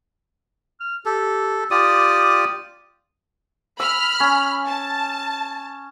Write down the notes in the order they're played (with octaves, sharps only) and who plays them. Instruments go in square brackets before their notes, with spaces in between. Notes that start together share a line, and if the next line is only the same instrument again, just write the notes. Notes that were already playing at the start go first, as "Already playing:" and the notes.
[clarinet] F6
[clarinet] G4 [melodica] A4
[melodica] F4 G4 D5 [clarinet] D#6
[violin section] B5 F6 [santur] E6
[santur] C#4
[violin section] A5